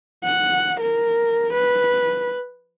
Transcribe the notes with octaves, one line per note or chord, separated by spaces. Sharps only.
F#5
A#4
B4